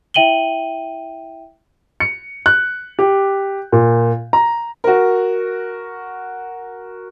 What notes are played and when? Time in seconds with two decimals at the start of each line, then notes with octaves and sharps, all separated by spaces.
0.14 E4 E5 G5 D#7 F#7 G7
2.00 C#7
2.46 F#6
2.99 G4
3.72 A#2
4.33 A#5
4.84 F#4 A#4